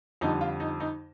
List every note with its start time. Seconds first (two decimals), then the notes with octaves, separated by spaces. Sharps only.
0.21 F2 D3 G3 D#4
0.41 F4
0.60 D#4
0.80 D#4